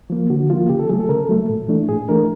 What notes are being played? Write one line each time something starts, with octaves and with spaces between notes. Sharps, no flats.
F3 A#3
D3 F#4
F3 A#3 F4
C#3 G4
A4
F#3 A3 G#4
A4
C#3 A#4
A4
F#3 A3
A2
E3 A3 D4
A2 G#4
E3 A3 D4 A#4